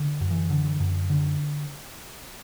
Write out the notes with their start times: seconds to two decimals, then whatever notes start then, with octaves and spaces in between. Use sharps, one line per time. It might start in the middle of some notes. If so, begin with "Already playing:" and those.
Already playing: D3
0.21 F#2
0.31 E3
0.50 D3
0.80 F#2
1.10 D3